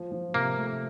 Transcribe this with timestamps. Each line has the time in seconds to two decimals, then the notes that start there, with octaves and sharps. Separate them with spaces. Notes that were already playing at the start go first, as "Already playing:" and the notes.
Already playing: F3
0.12 F3
0.34 C3 A#3
0.57 A3